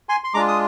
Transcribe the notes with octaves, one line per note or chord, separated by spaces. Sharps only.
G#5 C6
C6
G#3 D4 F4 A#5 D6
D#6